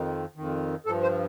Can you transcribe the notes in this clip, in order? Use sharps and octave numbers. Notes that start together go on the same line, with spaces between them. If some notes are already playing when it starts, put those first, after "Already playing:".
Already playing: F2 D#3
F2 D#3
G2 F3 A4
C5